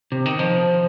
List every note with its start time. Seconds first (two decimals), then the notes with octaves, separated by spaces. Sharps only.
0.12 C3
0.26 D#3
0.39 F3